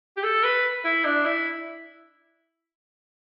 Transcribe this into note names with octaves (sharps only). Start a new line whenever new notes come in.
G4
A4
B4
E4
D4
E4